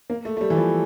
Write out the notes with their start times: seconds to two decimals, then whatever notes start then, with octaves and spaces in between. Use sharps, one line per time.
0.10 A#3
0.25 A3
0.37 A3
0.41 G3
0.50 E3
0.57 F3